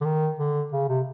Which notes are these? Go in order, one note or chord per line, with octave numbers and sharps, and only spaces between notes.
D3
D#3
D3
C#3
C3